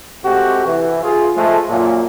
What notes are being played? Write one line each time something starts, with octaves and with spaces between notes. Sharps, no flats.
C3 G#3 A3 F#4 G4
E3
F4 G#4
F3 G#3 A3
F#2 A#2